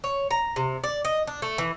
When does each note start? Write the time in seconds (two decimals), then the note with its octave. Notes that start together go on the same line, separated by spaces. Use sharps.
0.04 C#5
0.31 A#5
0.56 C3
0.84 D5
1.05 D#5
1.27 D4
1.42 A3
1.58 E3